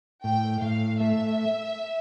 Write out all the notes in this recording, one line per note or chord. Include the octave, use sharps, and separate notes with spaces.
A2 G5
A2 F5
A3 E5